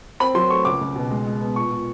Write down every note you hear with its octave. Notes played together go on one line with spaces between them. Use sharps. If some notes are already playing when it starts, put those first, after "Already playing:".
C4 B5
F#3 C6
A3 C#6
C#2 D6
C#2
B2
G#3
G#3
B3
A#2 C#6
A#2